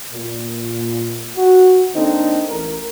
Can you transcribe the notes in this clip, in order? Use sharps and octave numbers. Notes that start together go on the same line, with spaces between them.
A#2
F#4
D3 A#3 C4 D4 D#4
A1 A#4